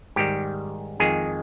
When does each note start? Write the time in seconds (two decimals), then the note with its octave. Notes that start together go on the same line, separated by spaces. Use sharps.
0.16 G#2 D#3 G3 G4
1.00 F2 D#3 G#3 G#4